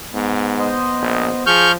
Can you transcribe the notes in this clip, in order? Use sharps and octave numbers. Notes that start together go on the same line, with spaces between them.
G#2 B3
C5 D#5
A#1
F3 G#4 C#6 F6 G6